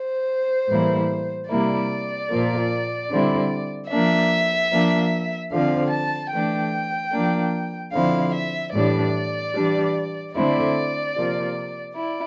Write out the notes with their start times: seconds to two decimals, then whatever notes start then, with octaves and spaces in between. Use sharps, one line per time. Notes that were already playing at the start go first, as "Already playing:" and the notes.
Already playing: C5
0.68 A2 E3 G3 A#3 E4
1.49 C3 G3 A#3 E4 D5
2.29 A#2 F3 A#3
3.09 D3 G3 C4 E4
3.90 F3 A#3 D4 E5
4.70 F3 A#3 D4
5.52 D3 F3 C4 F5
5.91 A5
6.31 E3 A3 D4 G5
7.13 F3 A#3 D4
7.92 D3 F3 C4 E4 F5
8.34 E5
8.73 A2 E3 G3 D4 D5
9.53 E3 G3 D4
10.35 D3 A3 C4 E4 D5
11.15 C3 F3 A#3
11.95 E4 D5